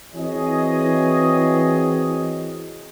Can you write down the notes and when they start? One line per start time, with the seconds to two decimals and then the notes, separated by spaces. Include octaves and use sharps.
0.12 E3 C4 F#4 G#4 C#5 D#5